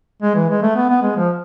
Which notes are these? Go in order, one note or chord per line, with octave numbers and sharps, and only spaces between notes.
G#3
E3
G#3
A3
B3
B3
G#3
F3